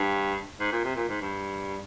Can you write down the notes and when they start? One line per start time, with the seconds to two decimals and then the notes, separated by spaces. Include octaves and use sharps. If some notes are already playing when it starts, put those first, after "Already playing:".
Already playing: G2
0.60 G#2
0.72 A#2
0.84 C3
0.96 A#2
1.09 G#2
1.21 G2